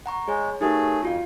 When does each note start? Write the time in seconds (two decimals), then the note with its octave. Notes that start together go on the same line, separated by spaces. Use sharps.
0.06 F#5 A#5 C#6
0.28 G#3 G#4 C#5
0.61 F#3 A3 D#4 G4 G#4 A#4
1.03 F2 F4 F#4 F5